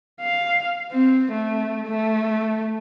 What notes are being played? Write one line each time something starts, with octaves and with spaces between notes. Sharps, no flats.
F5
C4
A3
A3